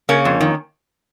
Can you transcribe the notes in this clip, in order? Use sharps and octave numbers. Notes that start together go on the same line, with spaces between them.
C#3 A#3 C#4
F2
D#3